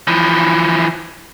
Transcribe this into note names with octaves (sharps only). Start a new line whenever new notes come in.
E3 F3